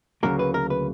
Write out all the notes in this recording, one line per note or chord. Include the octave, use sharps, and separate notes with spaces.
D2 C#3 F#3 A#3 A#4
B4
A#4
B4